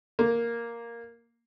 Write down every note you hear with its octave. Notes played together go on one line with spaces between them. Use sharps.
A#3